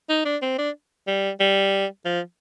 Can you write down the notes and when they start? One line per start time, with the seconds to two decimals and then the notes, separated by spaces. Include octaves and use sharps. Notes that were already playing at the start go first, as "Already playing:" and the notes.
0.09 D#4
0.25 D4
0.42 C4
0.58 D4
1.07 G3
1.40 G3
2.05 F3